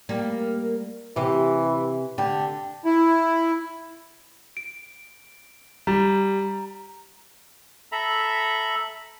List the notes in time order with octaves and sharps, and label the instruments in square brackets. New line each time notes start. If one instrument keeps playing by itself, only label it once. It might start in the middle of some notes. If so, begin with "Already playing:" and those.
[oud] G3 A#3
[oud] C3 G4 [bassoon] E3
[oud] D3 [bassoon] G4
[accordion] E4
[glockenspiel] D7
[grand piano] G3 [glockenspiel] A#5
[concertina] A4 E5 A#5 B5